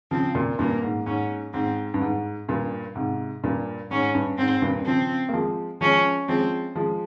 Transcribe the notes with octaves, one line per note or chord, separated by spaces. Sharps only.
C#3 F3 C4
A#2 C#3
G2 A#2 A#3
G#2
G#2 C#4
G#2 C4
G2
G#2
G2 A#2
G#2 C3
G2 A#2
G#2 C#4
G2
G#2 C4
G2 A#2
C#3 F3 C4
A#3
F3 G#3
F3 G#3 C#4
F3 G#3 C4
F3 G#3